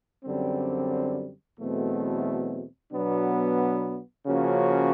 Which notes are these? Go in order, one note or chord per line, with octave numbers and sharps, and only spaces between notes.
F#2 D3 G3 C4
E2 B2 F#3 A3 C4
B2 F#3 B3 D4
C#3 F3 A#3 C#4 F#4